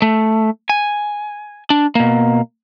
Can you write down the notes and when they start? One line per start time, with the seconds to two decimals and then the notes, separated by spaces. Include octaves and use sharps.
0.02 A3
0.69 G#5
1.70 D4
1.95 B2 A#3